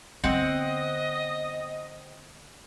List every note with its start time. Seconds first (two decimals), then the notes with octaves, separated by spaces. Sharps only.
0.24 D3 B3 C4 D#5 F#5